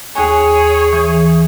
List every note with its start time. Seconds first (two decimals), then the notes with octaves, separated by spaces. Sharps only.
0.15 D#2 G#4 C#5 G#5
0.93 E3